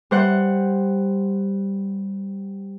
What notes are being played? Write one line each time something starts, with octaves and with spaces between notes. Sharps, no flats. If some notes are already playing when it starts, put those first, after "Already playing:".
G3 C5 F#5